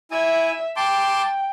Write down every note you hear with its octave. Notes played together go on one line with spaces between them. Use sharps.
E4 E5 G#5
G5 A5 C6 D6